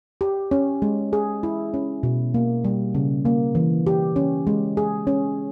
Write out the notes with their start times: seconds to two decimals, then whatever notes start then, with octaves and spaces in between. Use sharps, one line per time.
0.21 G4
0.51 C#4
0.82 G#3
1.13 G#4
1.43 E4
1.74 C#4
2.03 B2
2.34 A#3
2.65 G3
2.95 C#3
3.25 A#3
3.55 E3
3.87 G4
4.16 C#4
4.47 G#3
4.77 G#4
5.07 C#4